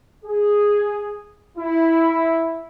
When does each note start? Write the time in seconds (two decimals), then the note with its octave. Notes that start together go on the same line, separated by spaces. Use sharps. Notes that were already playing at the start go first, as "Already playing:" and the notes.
0.25 G#4
1.58 E4